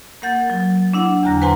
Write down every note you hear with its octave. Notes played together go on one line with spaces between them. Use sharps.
A#3 A#4 F#5 G6 A6
F#3
D4 E4 F#5
E2 D3 G#5 A#5 F#6 A#6
B4 C5 F#5 G#5 A#5 C6